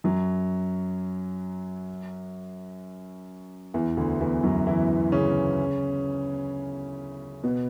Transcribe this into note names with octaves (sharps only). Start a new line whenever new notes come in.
F#2 F#3
E2 E3
D2 D3
E2 E3
F#2 F#3
E3 E4
C#3 C#4
B2 B3